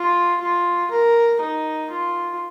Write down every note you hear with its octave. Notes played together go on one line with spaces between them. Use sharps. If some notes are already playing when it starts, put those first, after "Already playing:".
Already playing: F4
F4
A#4
D#4
F4